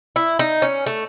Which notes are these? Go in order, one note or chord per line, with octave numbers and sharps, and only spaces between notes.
E4
D#4
C#4
A3